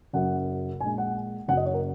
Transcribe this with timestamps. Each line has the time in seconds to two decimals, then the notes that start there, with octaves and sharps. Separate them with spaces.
0.13 F#1 F#2 F#3 F#5
0.81 A#1 A#2 G#3 G#5
0.98 F#5
1.48 F#1 F#2 F#3 F#5
1.57 D#5
1.66 C#5
1.74 A#4